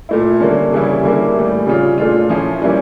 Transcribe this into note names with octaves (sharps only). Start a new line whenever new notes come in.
A#2 A3 E4
D3 G3 A#3 C#4
C#3 E3 G3 C#4 E4
D3 G3 A#3 E4
A2 E3 G3
C#3 G3 C#4 F4
A#2 A3 D4 F4
A#2 F3 C#4 E4
E3 G3 A#3 C#4 E4